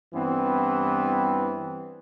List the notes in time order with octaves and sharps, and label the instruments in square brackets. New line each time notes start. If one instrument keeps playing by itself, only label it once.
[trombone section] G2 E3 G3 B3 C4